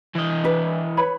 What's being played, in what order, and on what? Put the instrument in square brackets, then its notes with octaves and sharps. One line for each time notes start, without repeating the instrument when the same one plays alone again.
[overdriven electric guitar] E3 D#5
[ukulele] D4 B4
B4 C#5 B5